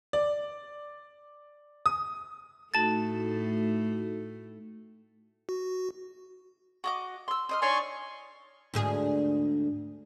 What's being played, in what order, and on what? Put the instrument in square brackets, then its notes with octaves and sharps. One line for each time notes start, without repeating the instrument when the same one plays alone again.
[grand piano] D5
D#6
[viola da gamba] A2 A3 [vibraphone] D#4 F#4 A4 [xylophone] A5 A6
[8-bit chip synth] F#4
[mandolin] F#4 D#5 D6
C6 E6
C5 D#5 F6
[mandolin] D4 D#4 C#5 [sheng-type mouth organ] G#5 C6 C#6
[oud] D2 G#2 G#4